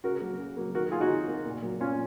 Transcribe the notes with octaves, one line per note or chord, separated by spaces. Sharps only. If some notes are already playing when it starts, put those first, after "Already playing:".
C#3 F#4 A#4
F#3 A#3
C#3
F#3 A#3
D#3 F#4 A#4
A#3 F4 G#4
D#4 F#4
D#3
A#3
A#2
F#3 A#3
A#2 C#4 F4